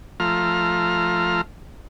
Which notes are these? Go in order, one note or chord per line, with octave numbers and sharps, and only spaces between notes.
F3 A3 F4 A#5 F6